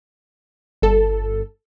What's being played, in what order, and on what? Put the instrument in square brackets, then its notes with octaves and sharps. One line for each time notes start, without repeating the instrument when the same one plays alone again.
[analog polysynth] G1 A4